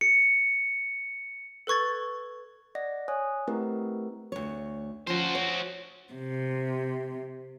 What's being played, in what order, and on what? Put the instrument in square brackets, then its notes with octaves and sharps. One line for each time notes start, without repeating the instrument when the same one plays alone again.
[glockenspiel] C#7
[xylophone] A4 B4 C#6 G#6 A6
[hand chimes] D5 D#5 F#5 A#6
C#5 G#5 D#6 F#6
A3 C4 E4 G4 A#4 B4
[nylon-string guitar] D2 C#5
[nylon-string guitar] F3 C#4 F4 [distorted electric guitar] F#4 C5
[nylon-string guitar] C#5
[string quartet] C3